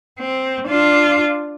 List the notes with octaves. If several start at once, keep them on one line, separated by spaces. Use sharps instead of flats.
C4
D4 F4